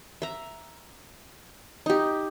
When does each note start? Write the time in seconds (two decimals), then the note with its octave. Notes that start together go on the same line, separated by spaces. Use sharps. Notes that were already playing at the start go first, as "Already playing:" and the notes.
0.22 E5 A#5
1.86 D#4 G4